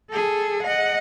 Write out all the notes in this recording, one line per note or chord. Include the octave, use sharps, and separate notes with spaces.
G#4 A4
D#5 F#5